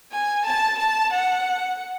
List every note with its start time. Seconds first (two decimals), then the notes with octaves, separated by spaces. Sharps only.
0.12 G#5
0.46 A5
0.79 A5
1.13 F#5